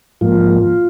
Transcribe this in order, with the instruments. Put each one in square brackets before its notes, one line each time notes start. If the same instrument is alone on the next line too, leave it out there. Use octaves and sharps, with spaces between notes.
[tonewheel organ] G#2 F3 A#3 F4